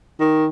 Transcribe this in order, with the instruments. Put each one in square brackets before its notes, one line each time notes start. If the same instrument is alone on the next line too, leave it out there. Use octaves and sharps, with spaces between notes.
[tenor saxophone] D#3